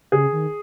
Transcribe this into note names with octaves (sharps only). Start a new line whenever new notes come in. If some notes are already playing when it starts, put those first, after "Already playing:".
C#3 G#4
D#3